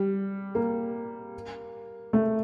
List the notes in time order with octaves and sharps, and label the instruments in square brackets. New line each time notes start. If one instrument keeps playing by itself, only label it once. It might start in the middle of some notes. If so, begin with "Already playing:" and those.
Already playing: [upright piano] G3
A#3
A3